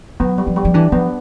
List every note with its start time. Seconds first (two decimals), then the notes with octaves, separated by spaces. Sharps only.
0.20 F#3 B3
0.38 G3
0.47 F3
0.56 G3
0.65 F3
0.74 E3 D4
0.92 F3 B3